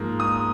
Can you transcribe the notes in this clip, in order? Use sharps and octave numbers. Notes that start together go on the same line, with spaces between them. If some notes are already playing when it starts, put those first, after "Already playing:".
Already playing: G#2 F3 A#3
D#6